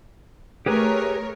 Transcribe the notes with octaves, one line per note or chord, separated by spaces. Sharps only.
A3 G4 G#4 A#4 B4 C#5